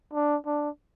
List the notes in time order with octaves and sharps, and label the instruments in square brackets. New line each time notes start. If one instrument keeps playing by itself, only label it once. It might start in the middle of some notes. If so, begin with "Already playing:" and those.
[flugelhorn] D4
D4